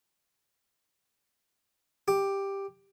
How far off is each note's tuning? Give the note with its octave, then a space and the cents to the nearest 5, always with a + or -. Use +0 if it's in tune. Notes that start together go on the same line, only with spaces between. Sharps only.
G4 +5